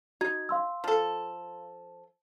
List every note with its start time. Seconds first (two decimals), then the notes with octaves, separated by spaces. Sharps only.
0.21 D#4 F#4 G#6
0.49 F5 C6 E6
0.84 F3 A4